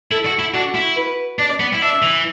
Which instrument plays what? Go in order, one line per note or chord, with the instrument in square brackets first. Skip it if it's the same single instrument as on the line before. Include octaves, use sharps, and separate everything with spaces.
[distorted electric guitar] E4 [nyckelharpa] A4
[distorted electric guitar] F#4
E4
[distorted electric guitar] D4 [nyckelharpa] F#4
[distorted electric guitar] E4
[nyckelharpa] B4
[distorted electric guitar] D4 [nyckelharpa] D5
[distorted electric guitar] B3
E4
[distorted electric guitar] D4 [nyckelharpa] E5
[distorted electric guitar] E3